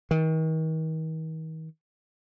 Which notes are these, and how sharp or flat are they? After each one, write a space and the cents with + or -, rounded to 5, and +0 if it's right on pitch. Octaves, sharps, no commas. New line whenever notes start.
D#3 +40